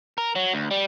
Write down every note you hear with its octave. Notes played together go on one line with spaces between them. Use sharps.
A#4
F#3
D2
G3